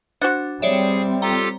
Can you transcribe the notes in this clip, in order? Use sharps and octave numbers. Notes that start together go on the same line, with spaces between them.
D4 F#4 C5 F#5
G3 C4 G#4 C#5 D5 E5
F4 G4 A4 G5 A#5